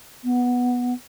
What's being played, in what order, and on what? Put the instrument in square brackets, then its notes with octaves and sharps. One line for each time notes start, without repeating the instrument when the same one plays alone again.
[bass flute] B3